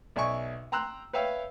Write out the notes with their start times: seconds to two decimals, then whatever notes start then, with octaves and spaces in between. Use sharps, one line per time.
0.16 B1 D5 E5 G#5 C#6
0.72 G5 A#5 C6 E6 F#6
1.13 B4 C#5 E5 F5 G5 E6